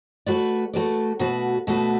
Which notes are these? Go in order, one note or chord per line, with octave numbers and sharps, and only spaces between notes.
A3 F#4 B4 D5
A3 F#4 B4 D5
B2 A3 F#4 B4
B2 A3 F#4 B4